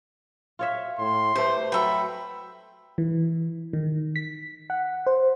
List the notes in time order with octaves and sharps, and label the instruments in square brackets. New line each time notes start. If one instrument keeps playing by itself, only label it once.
[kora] F4 C#5 E5
[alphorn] A2 [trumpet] C6
[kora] A3 G4 [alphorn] B4 [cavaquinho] C5
[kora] F#3 A3 [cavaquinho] E5 G5 [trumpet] B5
[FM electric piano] E3
D#3
B6
F#5
C5